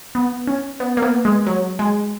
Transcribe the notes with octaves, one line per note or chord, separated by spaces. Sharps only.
B3
C#4
B3
A#3
B3
G#3
F#3
G#3